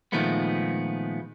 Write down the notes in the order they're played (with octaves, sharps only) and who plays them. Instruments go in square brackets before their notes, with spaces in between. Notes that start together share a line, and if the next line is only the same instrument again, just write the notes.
[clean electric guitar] A#2 D#3 F3 G#3 A3 B3